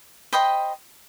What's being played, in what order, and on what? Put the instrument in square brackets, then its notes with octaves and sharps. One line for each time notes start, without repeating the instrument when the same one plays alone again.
[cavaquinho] C5 D#5 G5 B5